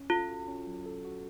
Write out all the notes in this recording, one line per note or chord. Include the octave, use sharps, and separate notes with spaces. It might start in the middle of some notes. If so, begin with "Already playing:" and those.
Already playing: C#4
F4 A4
F#4
C#4
F#3
A4
F#4